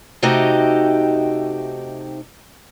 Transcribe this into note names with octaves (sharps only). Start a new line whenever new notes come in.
C3 A3 D#4 F#4 G4 D#5